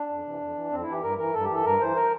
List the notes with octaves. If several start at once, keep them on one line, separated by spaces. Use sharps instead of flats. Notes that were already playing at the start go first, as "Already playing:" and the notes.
Already playing: D4
F2
C3 E3
F2
E3
F2 C4
E4
E3 G4
G2 A#4
E3 A#4
G2 A4
G4
E3 A4
G2 A#4
E3 C5
A#4